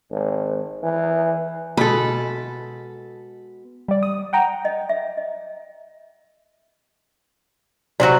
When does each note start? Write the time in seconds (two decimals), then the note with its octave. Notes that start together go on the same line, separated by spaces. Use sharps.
0.11 G#1
0.83 E3
1.77 B2 G#3 A4 B5
3.88 G3 D5
4.03 D#6
4.33 F#5 G5 A#5
4.65 D#5
4.89 E5
5.17 D#5
8.00 C3 F#3 F#4 D5